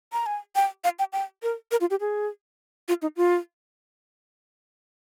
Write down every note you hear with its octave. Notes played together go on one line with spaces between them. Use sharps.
A#5
G#5
G5
F5
G5
G5
A#4
A#4
F4
G4
G#4
F4
D#4
F4